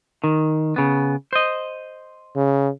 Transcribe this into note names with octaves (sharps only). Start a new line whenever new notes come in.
D#3
C#3 B3
C5 D#5
C#3